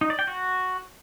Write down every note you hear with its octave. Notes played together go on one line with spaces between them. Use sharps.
D#4
D5
G5
F#4